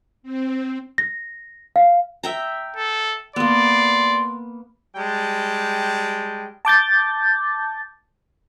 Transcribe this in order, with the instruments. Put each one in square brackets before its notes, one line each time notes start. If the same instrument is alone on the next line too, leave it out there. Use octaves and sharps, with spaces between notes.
[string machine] C4
[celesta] A#6
F5
[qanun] E5 G5 A#5
[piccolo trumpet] A4
[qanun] A#3 B3 [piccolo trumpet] D5 [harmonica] C6
[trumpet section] G3 G#3 G5 A5
[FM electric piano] A5 D6 G6 A6